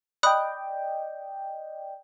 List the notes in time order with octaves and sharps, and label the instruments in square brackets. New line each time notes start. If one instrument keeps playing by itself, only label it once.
[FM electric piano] D5 D#5 G5 [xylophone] B5 D#6 F#6